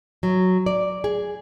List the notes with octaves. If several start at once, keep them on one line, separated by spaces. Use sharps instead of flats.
F#3
D5
G#4